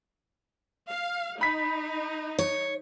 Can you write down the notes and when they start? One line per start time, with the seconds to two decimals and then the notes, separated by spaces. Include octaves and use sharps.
0.91 F5
1.41 D#4 B5 B6
2.39 C#5